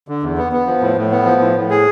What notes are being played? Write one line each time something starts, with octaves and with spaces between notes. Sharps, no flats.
D3
E2
B3
B3
F3
A2
A2
B3
F3
A2
A2
G#4